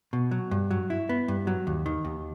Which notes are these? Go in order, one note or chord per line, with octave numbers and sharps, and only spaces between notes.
B2
F#3
G2
F#3
E4
B3
G2
F#3
D#2
D#3
D#2